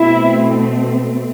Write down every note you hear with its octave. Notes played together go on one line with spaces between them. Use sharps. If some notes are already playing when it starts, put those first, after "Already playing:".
Already playing: B2 A3 C4 E4